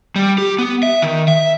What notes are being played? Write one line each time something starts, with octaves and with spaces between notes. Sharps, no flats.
G3
G4
B3
E5
D#3
E5